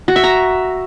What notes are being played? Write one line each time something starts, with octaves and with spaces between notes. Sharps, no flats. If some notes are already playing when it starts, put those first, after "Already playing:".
F#4
E5
A#5